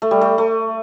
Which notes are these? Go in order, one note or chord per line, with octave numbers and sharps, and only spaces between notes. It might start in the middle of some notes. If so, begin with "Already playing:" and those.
A3
G3
A3
A3